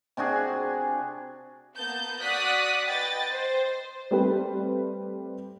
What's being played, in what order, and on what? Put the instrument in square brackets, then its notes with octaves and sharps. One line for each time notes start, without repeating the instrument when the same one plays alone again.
[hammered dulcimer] C3 D4 F#4 G#4
[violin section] A#3 B3 A5 G6
F#4 D5 D#6 F#6 B6
B4 D#5 G5 A6
C5
[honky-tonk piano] G3 A3 C4 G4 B4